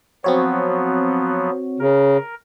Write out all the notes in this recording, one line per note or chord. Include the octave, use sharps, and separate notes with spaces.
F3 F#3 B3 C4 F#4 C#5
C#3 A#4